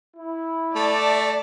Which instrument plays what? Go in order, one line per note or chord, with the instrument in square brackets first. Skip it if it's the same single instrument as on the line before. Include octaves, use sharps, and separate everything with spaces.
[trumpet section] E4
[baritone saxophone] A3 [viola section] D5 A5